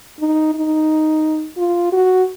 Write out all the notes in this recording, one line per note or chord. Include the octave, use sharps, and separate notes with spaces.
D#4
D#4
F4
F#4